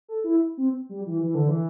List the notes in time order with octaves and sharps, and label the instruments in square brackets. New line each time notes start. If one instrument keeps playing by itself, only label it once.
[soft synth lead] A4
E4
C4
G3
E3
E3
D3
E3